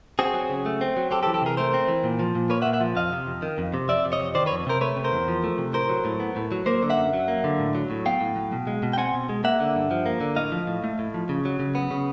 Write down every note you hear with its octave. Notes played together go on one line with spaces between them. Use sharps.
C4 F#4 G#4
F#3
C#3
A3
C4
F#3
C4 G4 A4
G4 A4
E3
G4 A4
C3 G#4 A#4
A3 A#4 C5
C4
E3
A#2
F3
A#2
A#3 B4 C#5
E5 F#5
A#2
E5 F#5
F3
F2 D#5 F5
C3
F2
D#3
F2
C3
F2 D5 E5
C3
C#5 D#5
F2
D#3 C5 D5
B4 C#5
F2
C3 A#4 C5
A3 B4 C#5
C3
A#4 C5
E2
F3
A3
C3
A2 A#4 C5
F#3
A2
B3
A2
F#3
A#3 A#4 C5
D3
E5 F#5
F#2
F#3
A#3
D3
A2
F#3
A2
B3 F5 G5
A2
F#3
B2
G#3
B2
G5
C4 F#5 G#5
B2
G#3
A#3 E5 F#5
D3
G2
F3
A#3
D3
A2 D#5 F5
F3
A2
A3
A2
F3
C#3
F#3
C#3
B3
C#3